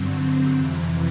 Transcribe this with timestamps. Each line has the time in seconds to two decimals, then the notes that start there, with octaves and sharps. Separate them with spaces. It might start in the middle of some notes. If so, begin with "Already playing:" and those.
Already playing: G2 D3 F#3 C4
0.57 F2 C3 E3